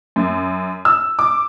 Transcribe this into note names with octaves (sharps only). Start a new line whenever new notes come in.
F#2
E6
D6